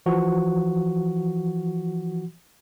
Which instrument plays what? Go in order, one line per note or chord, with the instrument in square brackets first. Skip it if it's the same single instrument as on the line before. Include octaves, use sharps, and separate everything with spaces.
[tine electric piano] E3 F3 F#4